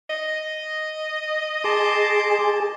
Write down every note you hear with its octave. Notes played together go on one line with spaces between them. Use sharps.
D#5
G#4 A5 C6 D6